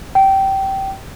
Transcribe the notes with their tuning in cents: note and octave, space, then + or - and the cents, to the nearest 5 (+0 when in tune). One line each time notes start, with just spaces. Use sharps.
G5 -15